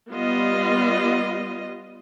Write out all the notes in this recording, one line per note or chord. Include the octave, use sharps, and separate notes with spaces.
G3 B3 F4 D#5